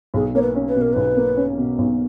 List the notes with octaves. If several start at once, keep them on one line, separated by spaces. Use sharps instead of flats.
B1 G#4
A#3 C#5
B4
C#4
B4
B2
A#4
B1 B4
A#3
C#4
B2
B1